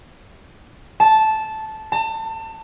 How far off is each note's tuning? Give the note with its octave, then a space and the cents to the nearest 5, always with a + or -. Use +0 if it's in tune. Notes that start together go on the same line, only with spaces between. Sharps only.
A5 -10
A5 +30